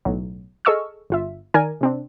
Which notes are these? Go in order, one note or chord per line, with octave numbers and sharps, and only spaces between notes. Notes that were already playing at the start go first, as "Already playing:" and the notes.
B1 A2 F#3
G#4 A4 D#5 C#6 E6 F6
G1 F4 E5
D#3 D#4 A#4 D5 G#5
C3 C4 D4